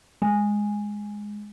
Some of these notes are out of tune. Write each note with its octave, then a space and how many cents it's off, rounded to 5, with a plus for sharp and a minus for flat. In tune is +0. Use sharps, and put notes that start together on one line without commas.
G#3 -5